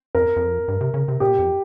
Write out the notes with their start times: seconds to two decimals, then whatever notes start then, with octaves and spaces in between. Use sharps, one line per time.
0.15 F2 A#4
0.36 F2
0.68 G2
0.81 C3
0.94 C#3
1.08 C3
1.20 A#2 G4
1.39 F2